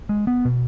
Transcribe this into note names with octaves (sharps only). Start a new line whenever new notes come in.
G#3
B3
B2